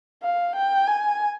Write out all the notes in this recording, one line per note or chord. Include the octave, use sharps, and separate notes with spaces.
F5
G5
G#5